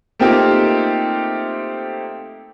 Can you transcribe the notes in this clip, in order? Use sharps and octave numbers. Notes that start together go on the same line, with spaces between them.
A3 A#3 C4 D#4 F4 G4